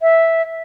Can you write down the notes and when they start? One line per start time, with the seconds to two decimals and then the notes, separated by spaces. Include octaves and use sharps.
0.01 E5